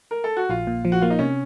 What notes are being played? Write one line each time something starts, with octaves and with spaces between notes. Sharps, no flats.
A#4
A4
F#4
A#1 F4
A#2
F3
F#4
A#3 F4
D#4
C3 C#4